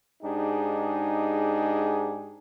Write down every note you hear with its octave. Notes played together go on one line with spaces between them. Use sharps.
G#2 D4 D#4 G4 G#4